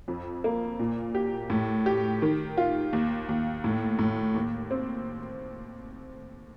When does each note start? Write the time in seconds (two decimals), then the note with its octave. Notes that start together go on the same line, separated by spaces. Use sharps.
0.08 F2
0.44 A#3
0.79 A#2
1.15 G4
1.50 A2
1.86 G4
2.22 D#3
2.58 F4
2.93 D#2
3.29 D#2
3.64 A2
3.99 A2
4.34 D#2
4.71 C4